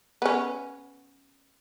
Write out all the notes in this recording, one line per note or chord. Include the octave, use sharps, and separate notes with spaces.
B3 C#4